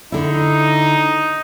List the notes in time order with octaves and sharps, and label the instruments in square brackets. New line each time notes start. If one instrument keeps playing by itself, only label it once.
[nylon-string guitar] D3 E4 [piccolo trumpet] D#4